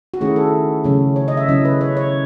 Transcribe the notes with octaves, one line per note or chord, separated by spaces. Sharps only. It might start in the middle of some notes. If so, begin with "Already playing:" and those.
F#4
D#3 A3 C#4 E4 G#4
A4
C#3 F#3 A3 C#4
C#5
D#5
E5
C#3 F#3 C#4 E4 D#5
B4
C#5
C#5